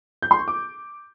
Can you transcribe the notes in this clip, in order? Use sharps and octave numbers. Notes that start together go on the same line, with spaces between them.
G6
C6
C#6
D6